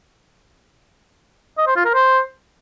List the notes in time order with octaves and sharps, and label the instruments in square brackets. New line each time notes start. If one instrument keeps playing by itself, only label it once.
[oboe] D#5
C5
F4
A#4
C5